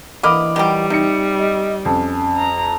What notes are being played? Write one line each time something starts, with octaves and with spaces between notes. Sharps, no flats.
D3 E3 A#3 D#5 B5 D6 F6
D#3 F#3 G3 G4
C3 D#4 C#7
D#5
F2 C#4
A#5